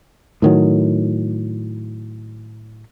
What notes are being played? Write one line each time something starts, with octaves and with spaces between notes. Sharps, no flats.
A2 D#3 F#3